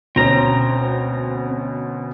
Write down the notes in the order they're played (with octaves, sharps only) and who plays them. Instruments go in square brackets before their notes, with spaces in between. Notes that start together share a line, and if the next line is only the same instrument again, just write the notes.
[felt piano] D2 B2 C#4 [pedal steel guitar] C4 A#5